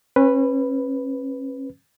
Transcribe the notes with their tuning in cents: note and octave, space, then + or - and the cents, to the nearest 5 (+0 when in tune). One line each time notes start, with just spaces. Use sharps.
C#4 -35 B4 +0